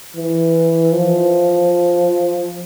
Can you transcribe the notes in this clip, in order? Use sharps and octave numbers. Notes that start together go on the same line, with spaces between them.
E3
F3